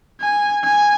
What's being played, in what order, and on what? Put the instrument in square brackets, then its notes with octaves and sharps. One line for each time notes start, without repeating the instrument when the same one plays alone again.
[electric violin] G#5
G#5